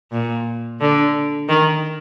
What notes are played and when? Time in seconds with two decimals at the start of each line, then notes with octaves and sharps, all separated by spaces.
0.12 A#2
0.80 D3
1.49 D#3